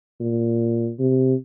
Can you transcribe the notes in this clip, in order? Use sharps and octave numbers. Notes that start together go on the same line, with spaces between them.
A#2
C3